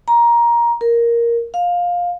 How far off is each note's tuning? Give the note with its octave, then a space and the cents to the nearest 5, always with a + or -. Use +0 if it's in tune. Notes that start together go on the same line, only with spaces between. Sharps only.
A#5 +15
A#4 +5
F5 +15